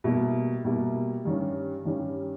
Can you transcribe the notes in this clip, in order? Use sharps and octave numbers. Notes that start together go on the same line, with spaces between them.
B2 G3 A#3 E4
B2 G3 A#3 E4
G2 D#3 G3 C#4
G2 D#3 G3 C#4